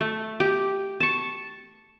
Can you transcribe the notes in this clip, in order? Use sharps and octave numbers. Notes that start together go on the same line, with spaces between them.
A3
G4
A5 C#6